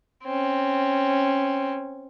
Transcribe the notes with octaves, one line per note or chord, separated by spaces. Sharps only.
C4 C#4